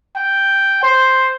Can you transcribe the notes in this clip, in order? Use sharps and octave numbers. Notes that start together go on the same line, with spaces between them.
G5
C5